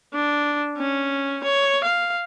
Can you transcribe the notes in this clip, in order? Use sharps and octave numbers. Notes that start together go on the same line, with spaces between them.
D4
C#4
C#5
F5